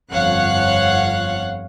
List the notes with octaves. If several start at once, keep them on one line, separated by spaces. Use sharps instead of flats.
G1 F2 C#5 F5 F#5 F#6